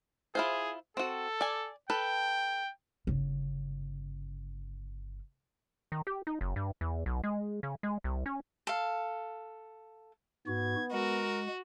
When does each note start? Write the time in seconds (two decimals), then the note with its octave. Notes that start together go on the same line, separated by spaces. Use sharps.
0.35 E4 F4 G#4 C5
0.97 C4 F#4 A4
1.41 D5 G#5
1.90 A4 B4 G5
3.07 G1 C#3
5.92 D#3
6.07 G4
6.27 D#4
6.41 F#1
6.56 G2
6.81 E2
7.06 B1
7.24 G#3
7.63 C#3
7.83 G#3
8.04 C2
8.26 C#4
8.67 A4 F5
10.47 G#2 B3 F#4 G#6
10.92 G#3 F#4 A#4